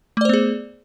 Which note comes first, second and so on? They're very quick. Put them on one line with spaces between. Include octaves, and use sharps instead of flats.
A3 D5 C5 B3 G#4